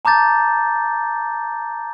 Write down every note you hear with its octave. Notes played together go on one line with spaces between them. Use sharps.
A5 A#5 D6 G6 A6